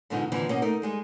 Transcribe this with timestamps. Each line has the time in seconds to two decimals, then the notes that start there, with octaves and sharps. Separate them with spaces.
0.10 G#2 B2 D3 F3 D4 D#4
0.32 D#2 D3 E3 F3 C4
0.49 B2 A#3 C#4
0.62 A3 D#4 A#4
0.82 G3 G#3 D#4